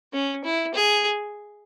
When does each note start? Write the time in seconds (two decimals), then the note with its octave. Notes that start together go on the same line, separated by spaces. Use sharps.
0.13 C#4
0.44 E4
0.74 G#4